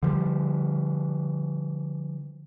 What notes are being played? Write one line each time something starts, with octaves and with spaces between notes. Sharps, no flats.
D3 F3 G3